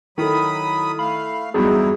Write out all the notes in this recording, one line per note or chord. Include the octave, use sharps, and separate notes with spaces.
D#3 F#3 E4 A4 B5 D#6
A3 F5 B5
E2 G2 F#3 D#4 E4 G#4